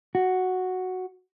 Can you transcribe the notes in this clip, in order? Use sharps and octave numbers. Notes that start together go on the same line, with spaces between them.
F#4